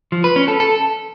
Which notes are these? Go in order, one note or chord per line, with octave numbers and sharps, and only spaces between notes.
F3
B4
C#4
A4
A4